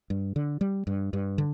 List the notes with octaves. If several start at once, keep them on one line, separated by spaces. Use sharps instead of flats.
G2
D3
G3
G2
G2
D3